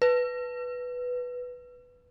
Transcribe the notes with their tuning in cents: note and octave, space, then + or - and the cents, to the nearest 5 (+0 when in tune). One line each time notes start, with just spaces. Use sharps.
B4 +0